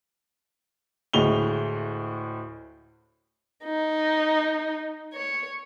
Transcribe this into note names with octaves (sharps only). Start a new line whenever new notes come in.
D2 A2 G#3 F7 G7
D#4
C#5